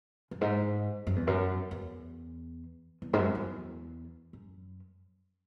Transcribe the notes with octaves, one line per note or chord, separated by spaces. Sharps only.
F#2
G#2
F#2
E2
F#2
E2
E2
G#2
F#2
E2
F#2